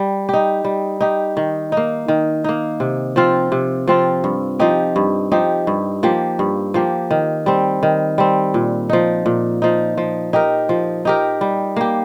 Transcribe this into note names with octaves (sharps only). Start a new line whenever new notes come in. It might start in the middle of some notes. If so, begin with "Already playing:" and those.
Already playing: G3
D#4 G4
G3
D#4 G4
D#3
A#3 D#4
D#3
A#3 D#4
C3
F3 C4 F4
C3
F3 C4 F4
G2
F3 D#4 G4
G2
F3 D#4 G4
G2
F3 A#3 G4
G2
F3 A#3 G4
D#3
G3 C4
D#3
G3 C4
A#2
F3 D#4
A#2
F3 D#4
F3
D#4 G4 A#4
F3
D#4 G4 A#4
G3
A#3 G4